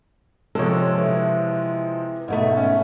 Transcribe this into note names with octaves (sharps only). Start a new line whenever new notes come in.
C3 F3 G#3 A4 C#5
E3
G#2 B2 A3
C#4